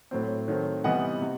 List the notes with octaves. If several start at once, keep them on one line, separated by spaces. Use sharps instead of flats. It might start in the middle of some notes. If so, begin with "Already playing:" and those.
A2 F#3 C4
D#3 F#3 A3 C4
C3 E3 G3 B3 D#5 F#5
C3